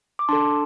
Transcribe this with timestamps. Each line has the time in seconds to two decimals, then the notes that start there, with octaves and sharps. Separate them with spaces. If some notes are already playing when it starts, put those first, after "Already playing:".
0.19 D6
0.29 D4 A4 A5 C6